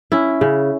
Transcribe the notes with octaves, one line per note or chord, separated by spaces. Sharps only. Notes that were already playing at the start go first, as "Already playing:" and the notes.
C#4 E4
C#3